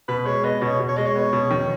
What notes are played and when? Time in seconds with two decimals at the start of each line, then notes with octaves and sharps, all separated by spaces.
0.08 B2 B4
0.26 G#3 C#5
0.44 B3 D#5
0.62 B2 C#5
0.79 B2
0.89 C#5
0.97 G#3 D#5
1.06 C#5
1.16 B3
1.33 B2
1.51 D#3